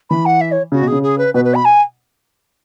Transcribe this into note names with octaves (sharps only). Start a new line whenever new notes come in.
E3 B5
F#5
E5
C#5
C#3 F#4
B2
C#3 G#4
G#4
B4
B2 B4
B4
B5
G#5